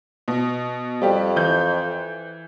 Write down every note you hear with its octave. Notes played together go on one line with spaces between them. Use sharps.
B2
F2 G3 G4
E3 G6